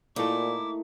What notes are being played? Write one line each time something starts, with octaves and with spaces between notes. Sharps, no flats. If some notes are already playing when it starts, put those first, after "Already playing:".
A#2 A3 A#3 D#4 E4 D6